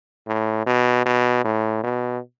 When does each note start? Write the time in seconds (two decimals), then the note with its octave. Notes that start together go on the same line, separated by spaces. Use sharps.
0.27 A2
0.66 B2
1.06 B2
1.44 A2
1.84 B2